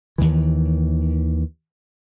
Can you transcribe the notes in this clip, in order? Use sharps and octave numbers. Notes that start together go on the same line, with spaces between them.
D#2 C3 D#3 E3